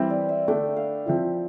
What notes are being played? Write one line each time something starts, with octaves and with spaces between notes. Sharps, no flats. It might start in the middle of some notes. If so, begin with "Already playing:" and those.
Already playing: E3 G3 C4 E4 B4
D5
E5
D3 A3 D4 G5
F5
F3 C4 E4